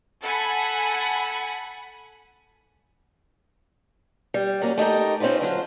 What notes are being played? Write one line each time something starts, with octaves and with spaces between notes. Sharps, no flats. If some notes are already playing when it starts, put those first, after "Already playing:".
A4 F#5 G#5 B5
G3
F#3 A#3 C#4
A3 D#4 G4 A#4
C4 C#4 D#4 F4 B4
D3 F#3 F4 C5